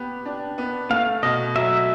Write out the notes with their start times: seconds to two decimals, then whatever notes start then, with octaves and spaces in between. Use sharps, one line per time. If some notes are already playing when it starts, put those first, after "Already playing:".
Already playing: B3 G4
0.25 D4
0.58 B3
0.90 A3 F5
1.23 B2 D#5
1.55 F#3 E5